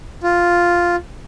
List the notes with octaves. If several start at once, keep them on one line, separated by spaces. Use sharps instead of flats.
F4